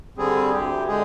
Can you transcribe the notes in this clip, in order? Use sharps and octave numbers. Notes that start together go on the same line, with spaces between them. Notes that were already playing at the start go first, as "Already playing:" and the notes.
D3 G3 C4 G#4
D2 G4
D3 G#3 G#4